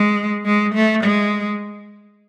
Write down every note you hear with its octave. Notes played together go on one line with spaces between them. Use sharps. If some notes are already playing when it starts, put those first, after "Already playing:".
Already playing: G#3
G#3
A3
G#3